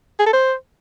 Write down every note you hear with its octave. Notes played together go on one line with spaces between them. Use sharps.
G#4
A4
C5